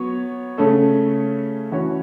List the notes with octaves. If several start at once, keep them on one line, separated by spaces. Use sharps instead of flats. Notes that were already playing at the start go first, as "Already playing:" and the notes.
Already playing: F#3 B3 C#5
C#3 A3 C#4 A4
E3 C#4 F#4 C#5